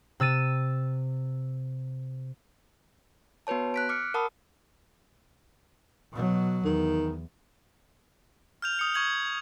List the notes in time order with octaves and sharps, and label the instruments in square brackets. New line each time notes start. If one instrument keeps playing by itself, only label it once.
[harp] C3 E6 A6 D#7
[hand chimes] B3 F#4 B4 C#5 A5
F#6 B6 D7
D6 F6 C#7
A#4 F#5 A5 B5 D#6
[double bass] B2 F#3
[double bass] E2 [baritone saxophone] D#3
[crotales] F6 G6 F7
D#6 C#7
C#6 G#6 F#7